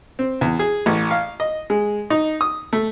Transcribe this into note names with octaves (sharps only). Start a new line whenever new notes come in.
C4
E2
G#4
A1
F5
D#5
G#3
D#4
D#6
A3